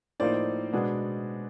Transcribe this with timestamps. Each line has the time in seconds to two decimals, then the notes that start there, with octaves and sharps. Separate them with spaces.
0.20 A2 F3 A#3 D#4 C5 D5
0.73 B2 G#3 B3 D4